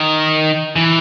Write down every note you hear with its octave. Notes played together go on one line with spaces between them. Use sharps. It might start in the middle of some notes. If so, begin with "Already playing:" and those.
Already playing: D#3
E3